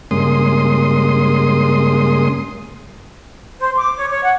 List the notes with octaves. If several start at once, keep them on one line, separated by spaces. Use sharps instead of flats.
G2 C#3 G#3 A#3 C6 D#6
C5
D6
C#5
C#5
F#5